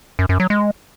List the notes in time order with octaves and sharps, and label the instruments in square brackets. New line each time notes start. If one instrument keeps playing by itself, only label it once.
[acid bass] F#2
F#2
F#3
G#3